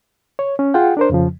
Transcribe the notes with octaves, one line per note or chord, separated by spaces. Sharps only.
C#5
C#4
F4 G#4 F#5 G5
D4 A#4 C5
F2 C#3 F3